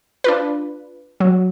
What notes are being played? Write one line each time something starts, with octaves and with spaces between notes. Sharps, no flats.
D4 F4 B4
F#3